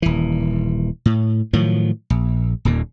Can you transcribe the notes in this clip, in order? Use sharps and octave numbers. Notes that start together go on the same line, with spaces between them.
D#1 E3
A2
A2 D#3 F3 F#3
A#1
D#1 D#2 A#2